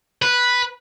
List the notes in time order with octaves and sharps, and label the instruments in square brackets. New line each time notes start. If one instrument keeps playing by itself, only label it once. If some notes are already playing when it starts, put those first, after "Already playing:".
[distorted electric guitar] B4